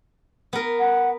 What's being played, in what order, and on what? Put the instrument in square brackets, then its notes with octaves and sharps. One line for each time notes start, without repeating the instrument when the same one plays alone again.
[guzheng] B3 A#4
[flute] F#5